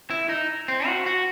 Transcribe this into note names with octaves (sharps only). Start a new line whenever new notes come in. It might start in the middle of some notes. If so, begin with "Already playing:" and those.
E4
D#4
C4
F#4
F#4